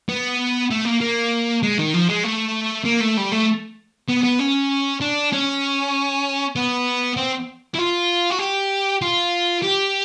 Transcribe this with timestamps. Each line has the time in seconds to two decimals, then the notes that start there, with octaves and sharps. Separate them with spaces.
0.09 B3
0.71 A3
0.85 A#3
1.01 A#3
1.63 G#3
1.78 D#3
1.94 F3
2.09 G#3
2.24 A3
2.85 A#3
3.01 A3
3.17 G3
3.32 A3
4.09 B3
4.24 B3
4.40 C#4
5.01 D4
5.32 C#4
6.56 B3
7.17 C4
7.74 E4
7.78 F4
8.31 F#4
8.40 G4
9.02 F4
9.63 G4